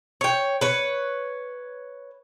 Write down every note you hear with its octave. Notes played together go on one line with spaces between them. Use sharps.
C#5 G5
B4 C#5